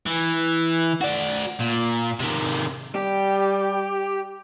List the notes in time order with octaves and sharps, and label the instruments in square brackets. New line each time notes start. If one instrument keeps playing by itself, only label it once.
[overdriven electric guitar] E3
F#4 D5
A#2
C3 D#3
[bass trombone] G3 [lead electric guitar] G4